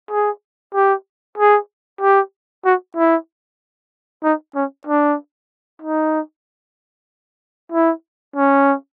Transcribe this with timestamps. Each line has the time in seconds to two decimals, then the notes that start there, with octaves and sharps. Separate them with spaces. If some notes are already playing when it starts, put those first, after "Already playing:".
0.11 G#4
0.74 G4
1.38 G#4
2.01 G4
2.65 F#4
2.96 E4
4.23 D#4
4.55 C#4
4.87 D4
5.82 D#4
7.72 E4
8.36 C#4